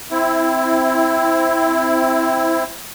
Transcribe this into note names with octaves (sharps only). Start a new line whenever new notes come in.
C4 E4